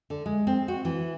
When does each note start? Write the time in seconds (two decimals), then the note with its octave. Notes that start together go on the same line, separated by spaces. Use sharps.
0.10 D3
0.26 G#3
0.47 C4
0.68 F#4
0.85 E3